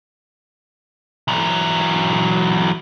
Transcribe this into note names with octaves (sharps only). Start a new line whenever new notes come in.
E3 F#3